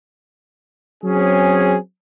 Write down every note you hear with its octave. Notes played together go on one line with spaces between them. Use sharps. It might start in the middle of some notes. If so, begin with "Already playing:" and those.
F#3 C4 C#4 G#4